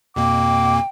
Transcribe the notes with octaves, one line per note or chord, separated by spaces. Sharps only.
F2 B2 A#3 G5 D6